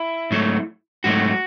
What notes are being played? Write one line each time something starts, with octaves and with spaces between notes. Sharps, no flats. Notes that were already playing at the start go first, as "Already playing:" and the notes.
Already playing: E4
G#2 F#3 A3
G#2 F#3 A3 F#4